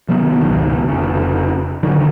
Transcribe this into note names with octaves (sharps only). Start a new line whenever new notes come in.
C3 D#3 F#3 B3
G#1 C#2 B2 D#3
F1 C#3
D3 D#3 F#3